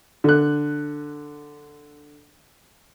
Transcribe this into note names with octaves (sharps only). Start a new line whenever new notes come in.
D3 F#6